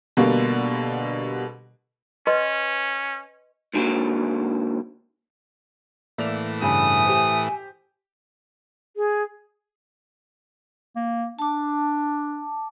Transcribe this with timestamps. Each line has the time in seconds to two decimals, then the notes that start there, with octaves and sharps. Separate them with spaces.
0.17 B2 D3 G3 A#3
2.27 C#4 B4 D#5 C6
3.74 G#2 D3 F#3 G#3 A#3
6.18 A2 E3 A#3 D5 F7
6.62 G2 C#3 G#5 D#6
7.05 G4 C5
8.97 G#4
10.96 A#3
11.39 D4 A5 D6